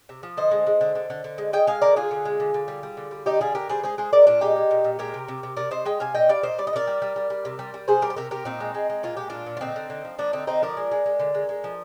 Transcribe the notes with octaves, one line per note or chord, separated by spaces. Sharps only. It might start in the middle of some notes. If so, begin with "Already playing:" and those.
C3
F3
D3 C5 D#5
G#3
G#3
D3
D3
D3
D3
G#3
G#3 D#5 G5
G#3 F5 G#5
D3 A#4 D5
D3 F4 G#4
D3
G#3
D3
D3
G3
G3
D3
G3
D3 D#4 G4
G3 F4 G#4
D3 G4 A#4
G3 G#4 C5
G#3 G#4 C5
G#3 G#4 C5
G#3 A#4 D5
A#2 D4 F4
G#3 D#4 G4
G#3
A#2
A#2
G#3 G4 A#4
C3
C3
C3
C3 A#4 D5
C3 C5 D#5
G#3 D#5 G5
C3 F5 G#5
A#2 D#5 G5
G3 D5 F5
A#2 C5 D#5
G3 D5
D#5
A#2 A#4 D5
G3
G3
G3
G3
C3
G3
G3
C3 G#4 C5
G3 G4 A#4
C5
C3 G4 A#4
C3 G4 A#4
A#2 C4 D#4
G#3
G#3
G#3
A#2 F4
G#3 G4
A#2 D4 F4
A#2
F4
D3 C4 D#4
D3
D3
F3
F3 A#3 D4
D3 C4 D#4
D3 C4 D#4
F3 A#4 D5
G#3
G#3
G#3
D3
G#3
G#3
F3